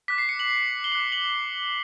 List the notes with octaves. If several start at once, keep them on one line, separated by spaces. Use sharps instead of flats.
D6 F#6 B6
C7
C#7
F#7
G7
D6 F#6 F#7
F#7